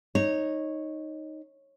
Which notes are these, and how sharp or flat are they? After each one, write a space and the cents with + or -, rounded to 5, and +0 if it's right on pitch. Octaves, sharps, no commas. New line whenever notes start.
D#4 +0 C#5 -15